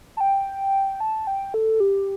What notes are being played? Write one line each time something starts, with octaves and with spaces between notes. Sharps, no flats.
A5
G5
A5
G5
A4
G4